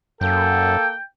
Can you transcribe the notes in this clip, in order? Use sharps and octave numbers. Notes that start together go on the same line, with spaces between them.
F#2 A#3 A4 G5